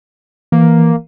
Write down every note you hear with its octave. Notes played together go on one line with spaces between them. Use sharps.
E3 A#3